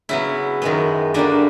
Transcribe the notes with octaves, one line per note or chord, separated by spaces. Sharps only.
C#3 F#3 B3 E4
F#2 D#3 G#3 B3
F#2 D3 G3 A#3 D4